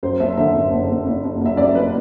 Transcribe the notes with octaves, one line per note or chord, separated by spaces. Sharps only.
F#2 C5
F#1 E5
D3 E5
F#1
F#1
F#1
F#1
F#1
F#1 E5
F#2 D5
F#1 B4